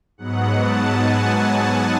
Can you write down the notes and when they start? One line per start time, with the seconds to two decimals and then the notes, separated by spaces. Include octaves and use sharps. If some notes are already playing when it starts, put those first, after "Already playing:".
0.18 G#2 F#3 B3 F#5
0.56 A5
0.95 G#5
1.32 F#5